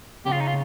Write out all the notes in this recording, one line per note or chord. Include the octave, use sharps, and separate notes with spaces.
C#3 G4
F4
D#4
F4